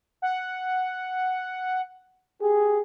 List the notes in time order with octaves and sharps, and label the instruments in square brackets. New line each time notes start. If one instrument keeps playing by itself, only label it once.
[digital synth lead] F#5
[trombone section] G4 G#4